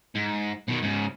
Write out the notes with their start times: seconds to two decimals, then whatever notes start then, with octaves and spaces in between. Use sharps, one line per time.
0.15 G#2
0.68 B2 D#3
0.82 G#2 C#3